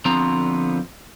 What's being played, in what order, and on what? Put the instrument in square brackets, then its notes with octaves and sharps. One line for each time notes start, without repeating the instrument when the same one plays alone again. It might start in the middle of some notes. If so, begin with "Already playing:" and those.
[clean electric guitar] D3 F3 B3 C4 F4 A#5